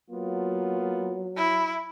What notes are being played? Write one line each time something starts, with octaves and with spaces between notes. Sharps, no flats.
F#3 A#3 B3 F4
E4